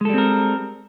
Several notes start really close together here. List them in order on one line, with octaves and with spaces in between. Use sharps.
G#3 A4 G3 C4 A#4